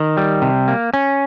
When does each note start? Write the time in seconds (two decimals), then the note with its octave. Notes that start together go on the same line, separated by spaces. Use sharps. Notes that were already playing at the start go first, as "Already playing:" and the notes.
Already playing: D#3
0.17 G3
0.42 C3
0.68 A#3
0.94 C#4